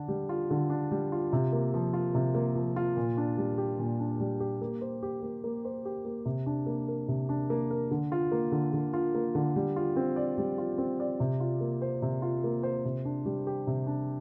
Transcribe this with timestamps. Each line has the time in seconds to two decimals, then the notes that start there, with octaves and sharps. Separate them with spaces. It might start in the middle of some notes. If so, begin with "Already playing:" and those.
Already playing: D3 D4
0.08 G3
0.29 F4
0.50 D3
0.70 D4
0.91 G3
1.12 F4
1.33 C3
1.52 A#3
1.74 F3
1.93 F4
2.15 C3
2.35 A#3
2.55 F3
2.76 F4
2.97 A#2
3.17 D4
3.38 G3
3.58 G4
3.79 A#2
4.00 D4
4.20 G3
4.40 G4
4.61 A#3
4.81 C5
5.03 G4
5.22 A#3
5.44 A#3
5.65 C5
5.85 G4
6.05 A#3
6.25 C3
6.46 D4
6.67 A#3
6.88 A#4
7.08 C3
7.29 D4
7.50 A#3
7.71 A#4
7.91 D3
8.12 F4
8.32 A#3
8.52 D3
8.73 D3
8.93 F4
9.15 A#3
9.35 D3
9.56 G3
9.76 F4
9.96 C4
10.16 D5
10.38 G3
10.58 F4
10.78 C4
11.00 D5
11.20 C3
11.40 F4
11.61 A#3
11.82 C5
12.02 C3
12.22 F4
12.44 A#3
12.63 C5
12.85 C3
13.05 D4
13.25 G3
13.47 G4
13.67 C3
13.87 D4